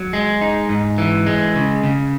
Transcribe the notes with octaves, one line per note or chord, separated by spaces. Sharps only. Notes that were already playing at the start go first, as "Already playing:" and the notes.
Already playing: F#3
G#3
D#4
G#2
E3
G#3
C#3
C#3